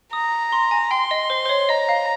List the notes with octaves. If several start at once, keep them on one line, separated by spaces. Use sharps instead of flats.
A#5 D#6
C6
G#5
G5 C6
D#5
C5
C5
C#5
D#5 A#5
F5